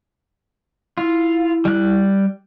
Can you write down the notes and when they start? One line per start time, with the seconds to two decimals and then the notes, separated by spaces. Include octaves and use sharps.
0.98 E4 F4
1.65 G3 F#6